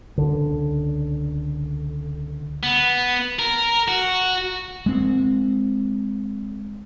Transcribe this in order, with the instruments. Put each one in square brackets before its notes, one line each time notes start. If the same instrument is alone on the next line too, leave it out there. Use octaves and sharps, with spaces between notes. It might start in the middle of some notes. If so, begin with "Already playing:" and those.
[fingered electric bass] C#2 D3
[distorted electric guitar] B3
A#4
F#4
[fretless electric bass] G#3 C4